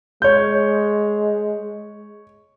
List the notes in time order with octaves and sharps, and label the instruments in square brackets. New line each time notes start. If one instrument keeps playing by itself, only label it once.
[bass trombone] G#3 [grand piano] C#5 G6